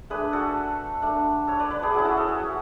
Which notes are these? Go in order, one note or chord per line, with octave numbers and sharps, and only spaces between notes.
A3 D4 G#4 B4
F#4 A4
A3 D4
A4 C#5
B4 D5
B4 D5
G#4 B4
F#3 C#4 E4 G#4
F#4 A4
A4 C#5
G#4
F#4